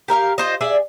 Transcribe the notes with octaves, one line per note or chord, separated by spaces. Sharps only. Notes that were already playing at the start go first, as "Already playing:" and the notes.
G4 A#4 E5 F5
F4 C5 D#5
G#4 D5 E5